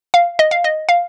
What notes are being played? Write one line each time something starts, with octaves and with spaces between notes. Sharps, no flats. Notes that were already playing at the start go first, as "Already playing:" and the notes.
F5
D#5
F5
D#5
F5